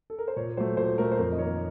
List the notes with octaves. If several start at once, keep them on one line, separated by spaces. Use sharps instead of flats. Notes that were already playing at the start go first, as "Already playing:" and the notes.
A4
A#4
C5
A#2 C#5
F#3 A3 C5
A#2 C5
F#3 A3 A#4
C5
F2 A#4
D#5
D#3 A#3 C#5